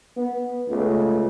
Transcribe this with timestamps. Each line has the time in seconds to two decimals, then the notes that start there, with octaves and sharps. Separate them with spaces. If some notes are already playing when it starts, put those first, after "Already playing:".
0.17 B3
0.69 C#2 A3